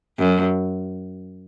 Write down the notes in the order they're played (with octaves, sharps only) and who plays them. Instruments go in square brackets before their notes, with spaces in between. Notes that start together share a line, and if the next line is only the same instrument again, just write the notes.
[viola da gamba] F#2